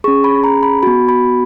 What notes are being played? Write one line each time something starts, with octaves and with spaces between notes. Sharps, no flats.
C#4 G#4 C#6
B5
A#5
B5
B3 F#4 B5
B5